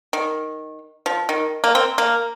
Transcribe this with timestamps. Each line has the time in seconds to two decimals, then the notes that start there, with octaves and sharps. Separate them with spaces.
0.13 D#3
1.06 F3
1.29 D#3
1.64 A#3
1.75 C4
1.98 A#3